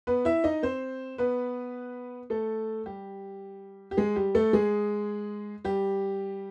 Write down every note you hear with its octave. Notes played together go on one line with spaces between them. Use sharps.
B3 B4
E4 E5
D#4 D#5
C4 C5
B3 B4
A3 A4
G3 G4
G4
G#3 G#4
G3 G4
A3 A4
G#3 G#4
G3 G4